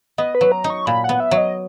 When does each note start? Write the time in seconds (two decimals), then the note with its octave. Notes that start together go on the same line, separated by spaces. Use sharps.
0.18 B3 D#5
0.35 B4
0.41 F#3
0.52 A#5
0.64 D#4
0.70 C#6
0.86 A#2 B5
1.04 B3 F#5
1.20 E5
1.31 F#3
1.37 D#5